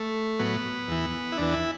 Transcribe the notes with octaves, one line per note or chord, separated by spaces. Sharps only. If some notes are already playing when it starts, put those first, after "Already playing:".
Already playing: A3
A2 F#3 B3
E2 E3
E4
E2 E3 D4
E4